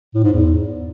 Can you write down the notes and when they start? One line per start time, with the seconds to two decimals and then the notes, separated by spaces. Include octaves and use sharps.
0.14 A2
0.23 G#2
0.32 E2